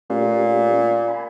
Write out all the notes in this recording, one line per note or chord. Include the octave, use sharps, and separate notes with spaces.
A#2 A3 C#4 G4
G#5 B5